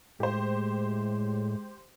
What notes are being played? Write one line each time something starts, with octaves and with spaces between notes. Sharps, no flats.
A2 G#3 G4 C5